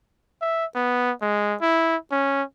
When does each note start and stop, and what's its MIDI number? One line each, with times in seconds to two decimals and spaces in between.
0.41 0.65 76
0.75 1.12 59
1.22 1.55 56
1.61 1.96 64
2.12 2.43 61